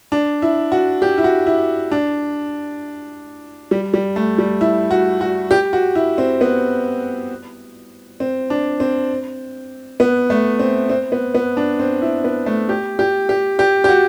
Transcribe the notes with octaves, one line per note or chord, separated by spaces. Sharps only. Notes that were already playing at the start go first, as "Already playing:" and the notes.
D4
E4
F#4
G4
E4
F#4
E4
D4
G3
G3
A3
G3
E4
F#4
F#4
G4
F#4
E4
C4
B3
C4
D4
C4
B3
A3
C4
C4
B3
B3
D4
C4
E4
B3
A3
G4
G4
G4
G4
G4
F#4